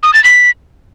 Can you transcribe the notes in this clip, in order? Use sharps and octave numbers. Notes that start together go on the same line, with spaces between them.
D#6
A6
B6